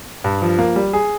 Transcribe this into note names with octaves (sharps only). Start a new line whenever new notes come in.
G2
F3
A#3
G3
G#4